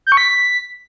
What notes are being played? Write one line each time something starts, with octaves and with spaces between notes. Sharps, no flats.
G6
C#6
B6